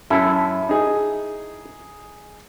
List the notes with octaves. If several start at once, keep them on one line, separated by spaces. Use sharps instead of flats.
F#2 E4 A4
D#4 G#4